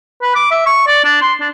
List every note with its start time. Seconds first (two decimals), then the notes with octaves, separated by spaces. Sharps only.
0.22 B4
0.35 D6
0.51 E5
0.66 C#6
0.87 D5
1.04 D4
1.21 C6
1.40 D4